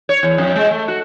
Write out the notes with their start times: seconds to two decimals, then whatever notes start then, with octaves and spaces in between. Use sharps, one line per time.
0.09 C#5
0.23 E2
0.38 F2
0.56 G#3
0.71 A3
0.88 F#4